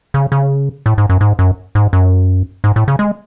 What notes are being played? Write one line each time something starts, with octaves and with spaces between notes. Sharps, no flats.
C#3
C#3
A2
G#2
F#2
G#2
F#2
G#2
F#2
G#2
A2
C#3
G#3